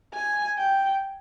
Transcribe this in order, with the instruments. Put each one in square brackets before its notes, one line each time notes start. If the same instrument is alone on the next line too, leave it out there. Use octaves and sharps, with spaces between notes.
[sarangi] G#5
G5